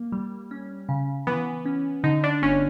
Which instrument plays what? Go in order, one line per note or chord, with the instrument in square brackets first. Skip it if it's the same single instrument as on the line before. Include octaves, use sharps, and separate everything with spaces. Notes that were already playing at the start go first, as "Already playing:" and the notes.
Already playing: [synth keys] A#3
G3
C#4
C#3
[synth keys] E3 [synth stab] B3
[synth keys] C#4
[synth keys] D3 [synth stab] D#4
[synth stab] D4
[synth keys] G1 [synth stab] C#4